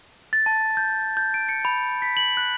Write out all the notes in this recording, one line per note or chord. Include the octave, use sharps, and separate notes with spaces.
A6
A5
G6
G6
D7
C#7
B5
B6
F#7
F#6